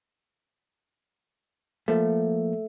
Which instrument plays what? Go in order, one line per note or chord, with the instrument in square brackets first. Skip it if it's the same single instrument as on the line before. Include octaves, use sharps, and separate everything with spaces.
[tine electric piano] F3 A#3 [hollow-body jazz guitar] A3